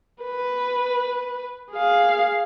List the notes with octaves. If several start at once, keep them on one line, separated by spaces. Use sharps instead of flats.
B4
G#4 F5